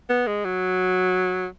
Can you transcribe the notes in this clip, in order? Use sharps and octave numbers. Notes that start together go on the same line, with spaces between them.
B3
G#3
F#3